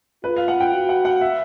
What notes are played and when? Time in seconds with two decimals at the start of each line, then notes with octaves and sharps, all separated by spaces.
0.24 F4 B4
0.37 F5
0.48 F#5
0.60 G5
0.73 F#4
0.89 F#5
1.05 F#5
1.21 E5